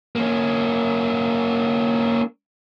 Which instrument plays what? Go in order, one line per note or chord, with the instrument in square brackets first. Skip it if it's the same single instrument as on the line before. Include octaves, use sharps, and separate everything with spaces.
[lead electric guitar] A#3 C#4